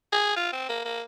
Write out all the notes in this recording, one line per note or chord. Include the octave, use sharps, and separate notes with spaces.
G#4
F4
C4
A#3
A#3